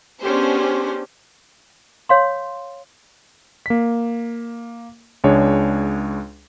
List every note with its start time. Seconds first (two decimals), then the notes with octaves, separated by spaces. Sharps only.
0.23 B3 C#4 D4 G4 G#4 C5
2.09 C#5 F5 C6
3.66 A#3 B6
5.24 C#2 G#3 D4 C#5